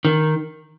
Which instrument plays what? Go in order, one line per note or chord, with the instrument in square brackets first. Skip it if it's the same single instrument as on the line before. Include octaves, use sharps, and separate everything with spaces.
[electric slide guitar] D#3